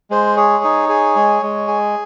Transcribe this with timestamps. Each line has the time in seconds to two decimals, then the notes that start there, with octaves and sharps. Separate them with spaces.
0.11 G#3 C5
0.37 G#4 C#5
0.64 D#4
0.89 G#4
1.16 G#3
1.43 G#3
1.68 G#4